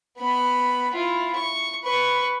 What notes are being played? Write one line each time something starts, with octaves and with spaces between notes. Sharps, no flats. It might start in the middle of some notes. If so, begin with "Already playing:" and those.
B3 B5
E4 F4
C#6
B4 C#6